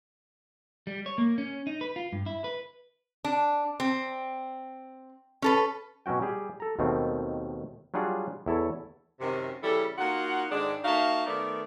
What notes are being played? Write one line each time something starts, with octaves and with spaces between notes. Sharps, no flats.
G3
C#5
A#3
C#4
D#4
B4
F4
G2
E4
B4
D4
C4
C#4 A4 B4
B2 F#3 C#4 F#4 G5
G3 G4 G#4
A4 A#5
D#2 B2 D#3 A3 C4
F#3 G3 D4 F4 G#4 F#5
E2 E4 A4 C#5
F#2 C3 D#3
C#3 E3 G3 E4 A4
A#3 D#4 F4 F#4 F#5
G#2 D#3 G#3 D4
A#3 D#4 F#4 E5 F5 A5
D#3 A3 B3 A#4 D5